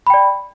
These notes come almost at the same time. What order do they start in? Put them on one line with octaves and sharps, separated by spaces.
B5 G5 D5